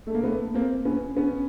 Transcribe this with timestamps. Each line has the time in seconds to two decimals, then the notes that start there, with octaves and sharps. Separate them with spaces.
0.07 A3
0.15 A#3
0.24 A3 B3
0.54 A#3 C4
0.85 B3 C#4
1.17 B3 C#4